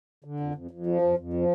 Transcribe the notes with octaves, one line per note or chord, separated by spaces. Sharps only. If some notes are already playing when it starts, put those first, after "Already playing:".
D3
F2
F2
F2
F3
F2
F2
F3